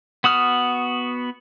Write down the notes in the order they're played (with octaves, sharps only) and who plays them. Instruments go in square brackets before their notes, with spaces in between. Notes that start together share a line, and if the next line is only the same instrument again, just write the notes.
[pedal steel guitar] B3 F#4 D#6 F6